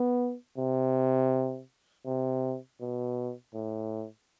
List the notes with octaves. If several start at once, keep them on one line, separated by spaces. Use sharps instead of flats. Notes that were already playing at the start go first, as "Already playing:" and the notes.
Already playing: B3
C3
C3
B2
A2